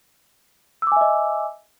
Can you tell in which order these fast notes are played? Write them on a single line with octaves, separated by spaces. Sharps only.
E6 D6 G#5 E5 D#5